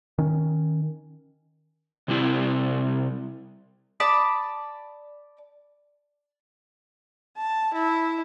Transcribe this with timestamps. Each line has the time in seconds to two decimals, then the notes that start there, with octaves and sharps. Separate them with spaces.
0.18 D#3 C#4
2.08 C3 G3 C4 E4
4.00 D5 A5 B5 D#6
7.38 A5
7.74 E4